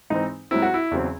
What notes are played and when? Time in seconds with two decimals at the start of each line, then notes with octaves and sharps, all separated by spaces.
0.10 G#2 E3 C4 D#4
0.51 G#2 F#3 C4 E4
0.62 F#4
0.74 E4
0.91 E2 C#3 F#3 C4